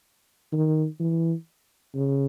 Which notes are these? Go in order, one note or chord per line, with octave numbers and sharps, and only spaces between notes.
D#3
E3
C#3